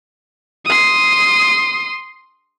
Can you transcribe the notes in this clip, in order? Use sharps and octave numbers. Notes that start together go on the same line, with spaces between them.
C6 D#6